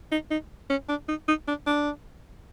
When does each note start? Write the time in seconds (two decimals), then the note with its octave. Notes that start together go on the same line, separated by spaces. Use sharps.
0.12 D#4
0.31 D#4
0.70 C#4
0.89 D4
1.08 D#4
1.28 D#4
1.48 D4
1.66 D4